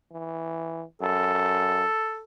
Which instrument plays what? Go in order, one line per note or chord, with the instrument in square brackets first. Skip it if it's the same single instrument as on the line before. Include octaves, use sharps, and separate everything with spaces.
[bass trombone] E3
[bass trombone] F#2 [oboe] A4